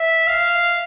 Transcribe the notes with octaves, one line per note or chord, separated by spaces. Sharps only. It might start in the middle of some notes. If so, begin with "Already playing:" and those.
Already playing: E5
F5